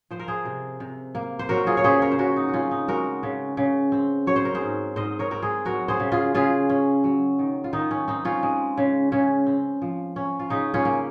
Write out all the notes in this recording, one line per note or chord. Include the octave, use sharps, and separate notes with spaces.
F3 C5
A#4
G#4 C5
C3
C3
A#3
C5
F#3 F#4 A#4
F4 G#4
C#5
C#3 G#4 C5
A#4 C#5
C5
C#3 F#4 A#4
D#4
F#4
C4 C#4 F4
D#4
G#3 F#4 A#4
C#3
C#3
C4
F#3 C#5
C5
A#4
G#4 C5
G#2
G#2 C5 D#5
A#4 C#5
C4 A#4
G#4 C5
F#3 F#4 A#4
G#4 C5
C#3
F4 G#4
C#3 F4 G#4
C#4
F#3
D#3
F4
D#3 D#4
C#4
C4 D#4
C#4 F4
G#3
C#3
C#3 C#4
C4
F3
C#4
F4
C#3 D#4
C#4 F4
A#3